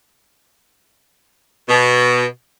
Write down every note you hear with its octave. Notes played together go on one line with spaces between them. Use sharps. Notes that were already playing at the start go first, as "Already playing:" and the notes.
B2